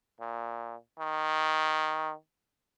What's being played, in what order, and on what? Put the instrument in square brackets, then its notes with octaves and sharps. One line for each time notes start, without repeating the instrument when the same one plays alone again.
[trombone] A#2
D#3